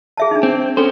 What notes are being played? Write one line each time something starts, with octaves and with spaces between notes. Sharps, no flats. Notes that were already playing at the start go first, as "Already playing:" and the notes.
G#4 E5 A5
D4 D#4
C4
C#4 A4 C5